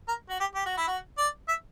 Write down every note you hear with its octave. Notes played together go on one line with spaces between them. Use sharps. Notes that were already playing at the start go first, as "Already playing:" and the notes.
A#4
F#4
G4
G4
F#4
E4
F#4
D5
E5